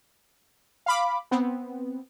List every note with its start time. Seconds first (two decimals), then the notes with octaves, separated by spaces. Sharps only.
0.86 F5 B5 D6
1.31 B3 C4